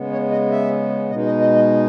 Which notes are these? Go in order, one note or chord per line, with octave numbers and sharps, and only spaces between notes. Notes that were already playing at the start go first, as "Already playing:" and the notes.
Already playing: C#3 G#3 B3
C#5
D#5
E5
B2 G#3 D#4 D#5
D#5
D#5
D#5